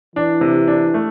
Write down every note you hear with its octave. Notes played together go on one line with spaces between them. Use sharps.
E3 D4
C3
D4
A3